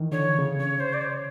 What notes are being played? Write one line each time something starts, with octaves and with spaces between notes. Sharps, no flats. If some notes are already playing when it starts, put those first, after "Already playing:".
Already playing: D#3 E3
D3 C#5
C#3
C#5
C5
D5
C#5